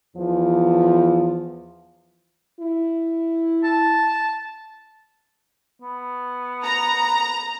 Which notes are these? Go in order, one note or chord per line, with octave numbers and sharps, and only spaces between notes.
E2 F3
E4
A5
B3
A#5